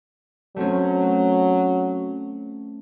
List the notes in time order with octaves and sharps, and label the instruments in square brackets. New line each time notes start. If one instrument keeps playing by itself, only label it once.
[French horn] F#3 [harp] A3 C4 C#4